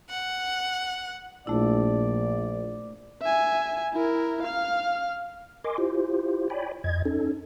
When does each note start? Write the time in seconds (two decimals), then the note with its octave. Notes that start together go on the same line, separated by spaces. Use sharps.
0.10 F#5
1.47 A#1 A3 E4 D5
3.21 E5 G#5
3.93 E4 A#4
4.43 F5 F6
5.64 A#4 D#5 G#5 C6 D6
5.78 E4 F4 G4 C5
6.50 C#5 D5 G5 G#5 B5
6.84 F2 D#5 G#6
7.05 C#4 D#4 A4